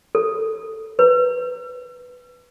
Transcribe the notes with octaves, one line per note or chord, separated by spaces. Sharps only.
A4
B4